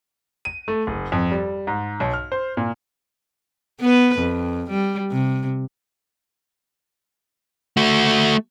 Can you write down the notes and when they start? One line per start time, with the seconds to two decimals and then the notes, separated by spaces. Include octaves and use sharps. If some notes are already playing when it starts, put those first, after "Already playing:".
0.45 D#7
0.68 A3
0.87 F#1
1.12 F2
1.31 G3
1.67 G#2
2.00 B1
2.13 F6
2.32 C5
2.57 A#2
3.81 B3 B4
4.19 F2
4.70 G3
5.11 C3
7.77 A3 F#4